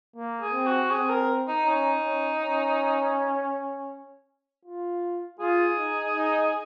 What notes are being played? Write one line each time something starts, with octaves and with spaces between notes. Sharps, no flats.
A#3
G#4
C4
F#4
C4 G#4
A#4
D#4
C#4 D#4
C#4
C#4
F4
F4 G#4
D#4
D#4